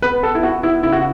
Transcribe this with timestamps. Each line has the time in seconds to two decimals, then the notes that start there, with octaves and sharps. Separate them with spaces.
0.02 B3 B4
0.23 B3 A4
0.35 E4
0.43 B3 F#4
0.63 B3 E4
0.83 C#3 E4
0.92 F#4